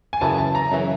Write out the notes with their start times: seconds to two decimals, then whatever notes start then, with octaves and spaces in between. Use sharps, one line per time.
0.13 G#5
0.21 F#2 C#3 E3 A5
0.38 A5
0.55 A#5
0.71 F#2 C#3 E3